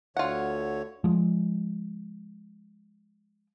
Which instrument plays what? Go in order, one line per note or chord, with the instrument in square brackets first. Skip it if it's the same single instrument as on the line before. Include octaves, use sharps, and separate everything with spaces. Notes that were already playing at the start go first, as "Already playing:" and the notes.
[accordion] D2 D3 C#5 [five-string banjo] F4 F#5
[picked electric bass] F3 G#3